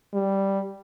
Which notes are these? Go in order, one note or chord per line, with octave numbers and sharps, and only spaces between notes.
G3